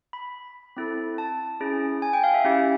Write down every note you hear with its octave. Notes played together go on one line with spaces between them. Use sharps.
B5
C4 E4 A4
A5
C#4 E4 G#4
G#5
G5
F5
E5
C#4 E4 G4 E5